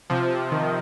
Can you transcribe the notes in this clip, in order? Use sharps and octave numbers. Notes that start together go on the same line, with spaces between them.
C3 F3
C3 F3
D#3